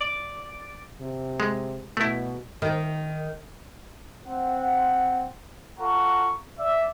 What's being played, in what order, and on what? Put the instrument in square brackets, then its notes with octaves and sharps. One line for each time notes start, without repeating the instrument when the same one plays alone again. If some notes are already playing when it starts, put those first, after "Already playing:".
[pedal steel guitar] D5
[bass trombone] C3
[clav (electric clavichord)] G#3
[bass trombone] B2 [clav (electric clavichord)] A3 E4
[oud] D#3
[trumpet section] C4 F#5
F4 A4 F#5 A#5 C#6
D5 E5